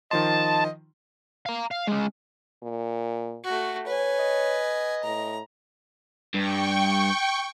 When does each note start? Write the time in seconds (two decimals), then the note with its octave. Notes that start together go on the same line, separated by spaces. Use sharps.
0.11 D#3 F3 D#5 A5 C6
1.46 F5 A#5
1.71 F5
1.87 G#3 C#4
2.63 A#2
3.44 A3 F#4
3.87 B4 C#5 G#5
4.19 D#5
5.04 A2 A#5
6.34 G2 G5 C#6